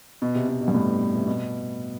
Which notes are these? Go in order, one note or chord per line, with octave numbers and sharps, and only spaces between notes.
B2
C3
B2
B2
G2
A2
C3
B2